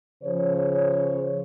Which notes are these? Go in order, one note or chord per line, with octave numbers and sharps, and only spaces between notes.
C#3 F3 C5 C#5